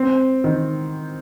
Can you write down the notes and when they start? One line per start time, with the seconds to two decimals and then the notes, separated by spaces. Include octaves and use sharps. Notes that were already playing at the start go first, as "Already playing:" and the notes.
Already playing: C4
0.44 D#3